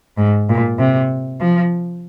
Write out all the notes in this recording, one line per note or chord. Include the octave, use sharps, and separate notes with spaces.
G#2
A#2
C3
F3